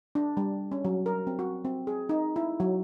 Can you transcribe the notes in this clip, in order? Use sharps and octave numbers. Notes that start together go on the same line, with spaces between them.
D4
G3
C#4
F#3
A#4
C4
F#4
C4
G#4
D#4
E4
F#3